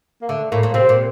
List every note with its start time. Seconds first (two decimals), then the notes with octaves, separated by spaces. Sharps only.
0.22 A#3
0.28 D3 A3
0.51 A2 A#3
0.63 A#2
0.74 C3 C4
0.89 A#2